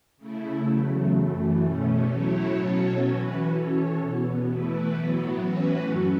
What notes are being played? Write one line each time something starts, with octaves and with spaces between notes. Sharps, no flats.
C#3 A3 E4
E2 C#3 F#3 A3
F#2 E3 A3
E2 B2 A3 C#4
A2 F#3 A3 E4 C#5
B2 F#3 C#4 A4 C#5
E3 C#4 F#4 B4
E3 C#4 A4 C#5
E2 B2 B3
E3 A3 E4 B4
A2 F#3 B3
A2 E3 C#4 F#4 B4
F#2 F#3 C#4 A4